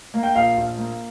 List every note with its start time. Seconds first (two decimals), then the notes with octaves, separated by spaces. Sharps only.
0.14 A#3
0.23 G5
0.35 A#1 F5
0.57 A#1
0.77 A#3